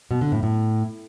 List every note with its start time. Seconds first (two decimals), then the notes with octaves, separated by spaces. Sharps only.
0.11 B2
0.21 D3
0.32 A2
0.43 A2